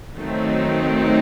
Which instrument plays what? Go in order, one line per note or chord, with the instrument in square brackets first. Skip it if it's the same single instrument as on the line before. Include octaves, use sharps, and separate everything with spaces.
[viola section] D#3 F#3 A3 C4 D#4